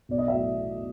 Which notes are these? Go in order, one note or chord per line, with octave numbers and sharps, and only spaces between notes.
B1 D5
D#5
A2 F#3 E5